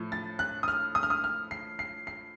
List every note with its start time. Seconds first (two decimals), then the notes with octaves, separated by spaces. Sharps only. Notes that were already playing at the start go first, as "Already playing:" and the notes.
Already playing: A2 F3
0.12 A6
0.39 F#6
0.63 D#6
0.68 F6
0.95 D#6
1.03 F6
1.10 D#6
1.24 F6
1.51 C7
1.79 C7
2.07 C7